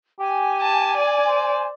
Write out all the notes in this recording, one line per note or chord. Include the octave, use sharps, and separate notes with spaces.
G4 G#5
A5
D5
C5